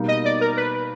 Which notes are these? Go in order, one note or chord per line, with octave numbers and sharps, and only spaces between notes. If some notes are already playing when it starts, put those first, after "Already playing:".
Already playing: B2 G3 A#3 D#4
D#5
D5
A#4
B4